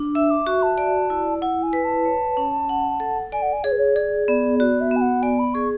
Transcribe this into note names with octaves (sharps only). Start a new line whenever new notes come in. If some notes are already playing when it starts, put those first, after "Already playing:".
Already playing: D4
E5 E6
D6
F#4 C#6
A5
D5
E4
E4 F#5
G#5
B4
A5
C#5
C#4
F#5
A4
D5 G#5
F#5
G#5
G#4 C#5
B4
C#5
G#4 D5
B3 D5
F#4 D5
E5
B3
G#5
F#5
D5 G#5
B5
G#4 C#6